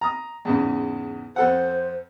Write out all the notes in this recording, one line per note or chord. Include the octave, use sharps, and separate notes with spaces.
A#5 D#6
E2 G#2 C#3
F2 A4 C5 F#5